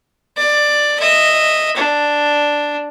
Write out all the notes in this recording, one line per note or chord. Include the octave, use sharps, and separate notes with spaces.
D5
D#5 E5
D4